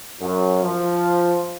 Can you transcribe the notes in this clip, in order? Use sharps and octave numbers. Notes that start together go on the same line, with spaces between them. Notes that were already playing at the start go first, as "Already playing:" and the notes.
F#2
F3